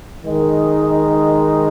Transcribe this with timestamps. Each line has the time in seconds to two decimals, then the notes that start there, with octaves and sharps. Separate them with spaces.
0.25 D#3 G#3 D#4